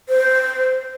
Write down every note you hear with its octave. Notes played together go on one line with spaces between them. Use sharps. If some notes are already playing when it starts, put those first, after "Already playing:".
C5